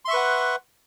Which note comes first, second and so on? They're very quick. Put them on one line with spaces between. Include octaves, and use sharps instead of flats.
C6 E5 C#6 B4 F#5